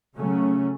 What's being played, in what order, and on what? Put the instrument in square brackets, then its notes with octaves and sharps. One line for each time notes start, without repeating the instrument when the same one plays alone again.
[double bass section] C#3 F#3 A3 C#4